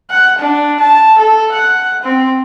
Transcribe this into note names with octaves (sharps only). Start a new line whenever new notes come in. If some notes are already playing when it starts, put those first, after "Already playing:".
F#5
D4
A5
A4
F#5
C4